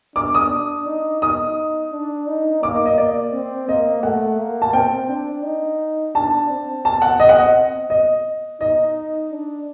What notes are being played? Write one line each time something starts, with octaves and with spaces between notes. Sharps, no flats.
D4 D6
D#6
D4
D#4
D#4 D#6
D4
D#4
A#3 D6
D#5
D#5
D5
C4
A#3 D#5
A3 F#5
A#3
A5
C4 G5
D4
D#4
D4 A5
C4
A5
F#5
D#5
F#5
D#5
D#5
D#4 D#5
D4